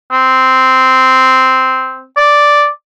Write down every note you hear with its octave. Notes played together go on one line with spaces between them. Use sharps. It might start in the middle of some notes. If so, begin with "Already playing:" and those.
C4
D5